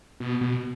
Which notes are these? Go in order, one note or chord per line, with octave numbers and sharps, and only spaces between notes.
B2
B2